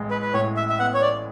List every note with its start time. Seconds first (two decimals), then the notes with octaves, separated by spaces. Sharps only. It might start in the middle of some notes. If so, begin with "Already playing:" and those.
Already playing: A1 G#3
0.11 B4
0.22 B4
0.34 A2 C#5
0.57 E5
0.69 E5
0.79 B3 F#5
0.94 C#5
1.02 D5